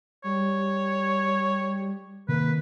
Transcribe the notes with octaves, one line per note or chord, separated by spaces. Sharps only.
G3 C#5
C3 D#3 A#3 B4